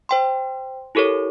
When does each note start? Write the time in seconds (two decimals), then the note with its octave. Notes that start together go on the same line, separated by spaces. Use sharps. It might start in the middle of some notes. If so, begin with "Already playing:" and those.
0.09 C5 G5 C6
0.95 E4 G4 A4 A#4 C#5